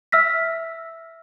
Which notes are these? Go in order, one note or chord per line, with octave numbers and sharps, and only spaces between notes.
E5 E6 F6 A#6 B6